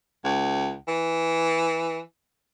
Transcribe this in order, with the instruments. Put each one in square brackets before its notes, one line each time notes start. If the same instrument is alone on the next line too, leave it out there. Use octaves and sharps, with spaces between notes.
[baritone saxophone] C#2
E3